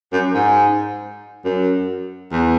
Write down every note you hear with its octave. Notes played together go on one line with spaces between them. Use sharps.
F#2
G#2
F#2
E2